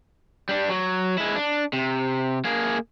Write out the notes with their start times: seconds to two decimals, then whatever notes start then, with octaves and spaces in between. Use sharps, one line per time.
0.49 G3 D4
0.69 F#3
1.18 G#3 E4
1.36 D4
1.73 C3
2.45 A#3 G#4